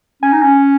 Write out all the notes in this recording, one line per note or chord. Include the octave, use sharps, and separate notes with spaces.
C#4 G#5
D#4
C#4